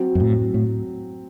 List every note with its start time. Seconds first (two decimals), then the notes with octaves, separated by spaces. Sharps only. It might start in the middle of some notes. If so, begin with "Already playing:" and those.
Already playing: F#3 C4 F#4
0.15 F#2
0.20 A2
0.54 A2